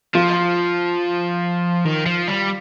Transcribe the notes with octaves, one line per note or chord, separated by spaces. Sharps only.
F3 F4
D#3
F3
G3